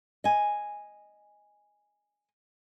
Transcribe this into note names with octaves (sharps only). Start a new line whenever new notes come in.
D#5 G#5